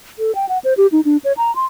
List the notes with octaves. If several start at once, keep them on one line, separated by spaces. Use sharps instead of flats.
A4
G5
F#5
C5
G4
D#4
D4
C#5
A#5
C6